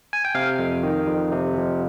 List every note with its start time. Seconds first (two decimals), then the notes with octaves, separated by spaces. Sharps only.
0.13 G#5
0.25 G5
0.35 C3 F5
0.59 F2
0.83 D#3
1.07 F2
1.32 C3
1.57 F2